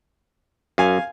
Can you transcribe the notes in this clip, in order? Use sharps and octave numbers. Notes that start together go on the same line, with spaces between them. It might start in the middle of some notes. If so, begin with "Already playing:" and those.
F#2 F5 G#5